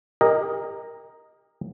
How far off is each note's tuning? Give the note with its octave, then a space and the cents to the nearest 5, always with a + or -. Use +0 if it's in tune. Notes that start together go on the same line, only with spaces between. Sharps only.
G4 +40 A#4 +0 D#5 +0